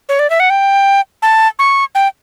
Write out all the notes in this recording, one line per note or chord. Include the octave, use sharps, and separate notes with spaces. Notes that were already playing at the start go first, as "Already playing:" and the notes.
C#5
D5
E5
F#5
G5
A5
C#6
G5